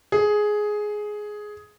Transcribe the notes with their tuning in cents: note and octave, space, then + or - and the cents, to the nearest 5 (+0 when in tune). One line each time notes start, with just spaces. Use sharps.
G#4 +10